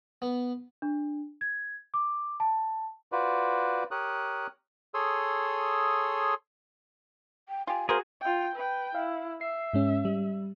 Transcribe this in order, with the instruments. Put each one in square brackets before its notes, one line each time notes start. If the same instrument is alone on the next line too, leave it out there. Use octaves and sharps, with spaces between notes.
[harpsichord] B3
[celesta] D4
G#6
D6
A5
[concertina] F4 F#4 B4 C5 D5
G4 A#4 C#5 D#6 F#6
G#4 A4 C#5 C6 D#6 E6
[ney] G5
[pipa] F4 G4 [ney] G#5
[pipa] A#3 A#4 C5 [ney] F#4 [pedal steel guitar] G#4
[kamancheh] F4 G5
B4 G5
[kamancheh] E4 [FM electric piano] F5
[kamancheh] E5 [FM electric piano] C7
[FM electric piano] G#2 G#3 C#4
G3